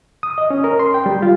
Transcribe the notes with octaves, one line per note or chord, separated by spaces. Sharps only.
D#6
D#5
C#4
A#4
C6
G5
G3
F4